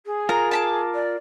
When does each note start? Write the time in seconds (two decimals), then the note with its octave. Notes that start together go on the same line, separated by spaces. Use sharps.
0.05 G#4
0.29 F4 A#4 A#5
0.51 A5 B5 D6
0.94 D5